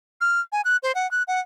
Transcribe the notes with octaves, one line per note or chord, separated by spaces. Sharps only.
F6
G#5
F#6
C5
F#5
F#6
F#5